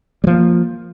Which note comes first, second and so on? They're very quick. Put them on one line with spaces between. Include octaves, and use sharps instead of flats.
G3 F3 A#3